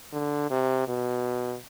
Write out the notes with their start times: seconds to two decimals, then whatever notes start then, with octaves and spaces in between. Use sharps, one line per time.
0.13 D3
0.51 C3
0.88 B2